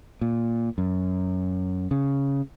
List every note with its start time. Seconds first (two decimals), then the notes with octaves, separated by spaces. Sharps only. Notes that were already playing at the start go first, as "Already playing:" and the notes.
0.21 A#2
0.78 F#2
1.91 C#3